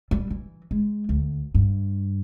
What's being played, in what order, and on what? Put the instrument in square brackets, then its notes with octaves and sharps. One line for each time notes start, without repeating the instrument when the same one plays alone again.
[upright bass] G3
E3
G#3
D2
G2